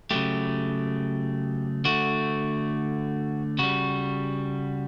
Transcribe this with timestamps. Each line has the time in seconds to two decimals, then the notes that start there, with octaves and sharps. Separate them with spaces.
0.11 C#3 F#3 A3 G4
1.85 D3 A3 F#4
3.59 C#3 G3 F#4